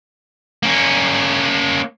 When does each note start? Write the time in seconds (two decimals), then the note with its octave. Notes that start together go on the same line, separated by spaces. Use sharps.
0.63 A#3 C#4